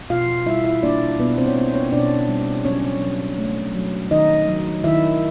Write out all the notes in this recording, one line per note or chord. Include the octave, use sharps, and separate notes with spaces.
B2 F4 F5
G3 E4 E5
E4 E5
A#3 D4 D5
B2 B3 B4
C4 C5
C#5
A#3 C4 C5
C#4 C#5
B2 D4 D5
G3
F#3 C#4 C#5
F#3
A3
F#3
D#3 D#4 D#5
F#3
D#3 E4 E5